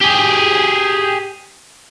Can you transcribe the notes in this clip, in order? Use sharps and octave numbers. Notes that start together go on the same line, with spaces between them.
G4 G#4